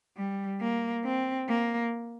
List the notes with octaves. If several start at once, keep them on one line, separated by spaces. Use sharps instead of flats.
G3
A#3
C4
A#3